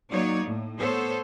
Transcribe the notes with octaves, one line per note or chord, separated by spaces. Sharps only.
F#3 A#3 D#4 C#5 D5
A2
B3 A4 C5 C#5